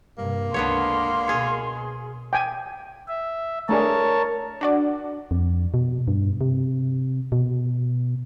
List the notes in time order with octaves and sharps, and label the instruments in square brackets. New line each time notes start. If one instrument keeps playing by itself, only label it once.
[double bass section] G2 C3 [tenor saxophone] A#3
[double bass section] C#2 [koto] D3 B3 C#5 [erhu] C6
[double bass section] B2 [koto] G#4 C#5
[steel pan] G5 G#5
[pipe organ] E5
[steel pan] A3 D4 G#4 [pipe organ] A#4 C#5 A5
[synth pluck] D4 F#4 D5
[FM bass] F2
B2
G2
C3
B2